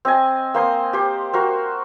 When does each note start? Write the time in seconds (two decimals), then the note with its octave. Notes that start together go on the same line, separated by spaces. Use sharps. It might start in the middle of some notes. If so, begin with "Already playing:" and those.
0.05 C4 D#5 G#5
0.54 A#3 C5 C6 D#6
0.93 G4 C5
1.33 F#4 A#4 C5